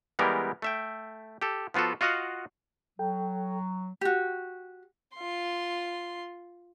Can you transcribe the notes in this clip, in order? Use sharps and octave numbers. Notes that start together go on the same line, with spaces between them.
E3 G3 G#3 B3 G4 A#4
A3 E5 G5
G4 A4
F3 B3 F4 F#4 A4
F4 F#4 D#5 F5 F#5
F#3 A4 G5
F#4 G4
F4 C6